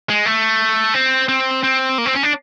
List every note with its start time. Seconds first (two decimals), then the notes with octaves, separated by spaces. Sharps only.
0.09 G#3
0.26 A3
0.94 C4
1.29 C4
1.64 C4
1.98 A#3
2.06 C4
2.15 C#4
2.23 D4